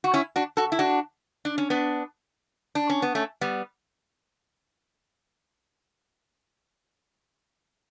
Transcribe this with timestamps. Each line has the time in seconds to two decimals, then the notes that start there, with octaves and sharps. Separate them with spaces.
0.04 F#4
0.14 C#4 E4
0.36 D4 F#4
0.57 F#4 A4
0.72 E4
0.79 D4 F#4
1.45 D4
1.58 C#4
1.70 B3 D4
2.75 D4
2.90 C#4
3.02 B3
3.15 A3 C#4
3.41 G3 B3